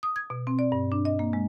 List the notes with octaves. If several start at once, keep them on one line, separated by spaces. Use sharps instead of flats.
D#6
G#6
B2
C4
D5
G2
D4
D#5
A#3
G#3